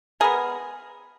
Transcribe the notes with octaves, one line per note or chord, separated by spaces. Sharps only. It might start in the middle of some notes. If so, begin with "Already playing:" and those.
G#3 B3 G#4 A#4